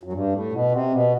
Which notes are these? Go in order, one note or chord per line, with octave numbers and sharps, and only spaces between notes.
F#2
G2
A2
B2
C3
B2